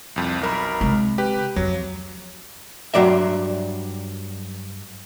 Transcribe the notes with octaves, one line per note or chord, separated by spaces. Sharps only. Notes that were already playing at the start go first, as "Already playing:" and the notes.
C2 F2
B1 A#4 B5
C3 G#3
G4 B4
F2 F3 F#3
G2 F#3 D5 E5